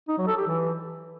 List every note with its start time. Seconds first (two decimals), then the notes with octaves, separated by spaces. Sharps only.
0.09 D#4
0.18 F#3
0.28 A4
0.37 G4
0.47 E3